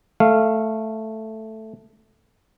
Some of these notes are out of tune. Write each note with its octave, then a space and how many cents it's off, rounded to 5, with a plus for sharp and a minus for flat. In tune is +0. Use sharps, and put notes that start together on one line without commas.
A3 +0 F5 -10